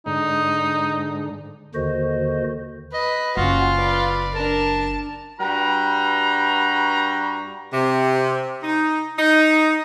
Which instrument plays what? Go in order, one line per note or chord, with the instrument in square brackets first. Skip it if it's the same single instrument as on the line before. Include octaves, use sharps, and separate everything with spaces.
[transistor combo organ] G#2 D3 [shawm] D#4
[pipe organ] D#2 D3 D#3 F#4 C5 D#5
[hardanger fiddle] B4 [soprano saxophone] D#5
[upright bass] F#1 [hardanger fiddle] C#4 F#4 [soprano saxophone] F4
[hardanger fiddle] B4 D5
[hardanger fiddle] D4 A#4 [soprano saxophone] A5
[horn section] G2 G3 F#4 B4 A#5
[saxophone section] C3
D#4
D#4